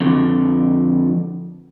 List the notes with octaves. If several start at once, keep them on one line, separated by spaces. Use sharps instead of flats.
F2 D3